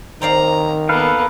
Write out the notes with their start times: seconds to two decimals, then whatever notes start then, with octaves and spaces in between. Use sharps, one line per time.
0.22 D#3 C4 D5 F5 A#5
0.89 A#3 B3 A4 B4 F5